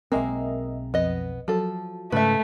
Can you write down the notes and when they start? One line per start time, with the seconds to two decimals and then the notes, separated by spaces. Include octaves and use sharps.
0.12 B1 G#3 A#3 C4 A#4 D#5 E5
0.94 F2 B3 D#5
1.48 F3 F#3 A4
2.12 G#2 C#3 A3 B4 E5